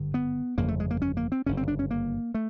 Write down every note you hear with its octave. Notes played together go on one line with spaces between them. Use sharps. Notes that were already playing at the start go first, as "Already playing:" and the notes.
Already playing: G#1 G2 D3
B3
G1 F2 C#3 A#3
A3
G#3
A#3
C#4
A#3
C4
G1 F#2 C#3 C#4
C4
D4
C#4
A#3
A3